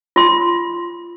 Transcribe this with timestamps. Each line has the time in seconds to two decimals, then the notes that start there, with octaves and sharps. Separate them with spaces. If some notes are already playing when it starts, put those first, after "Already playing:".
0.16 F4 C6